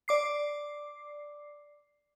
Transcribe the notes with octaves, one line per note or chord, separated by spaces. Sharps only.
D5 D6 C7